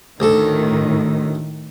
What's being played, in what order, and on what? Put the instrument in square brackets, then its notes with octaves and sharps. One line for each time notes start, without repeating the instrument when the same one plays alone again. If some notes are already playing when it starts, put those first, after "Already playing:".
[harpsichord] D2 A4 [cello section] A2 D#3